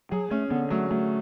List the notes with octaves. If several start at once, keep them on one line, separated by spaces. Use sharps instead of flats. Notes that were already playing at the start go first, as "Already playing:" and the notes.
F#3 G#4
A3 C#4
D3 B3
F#3 A3
F#3 A3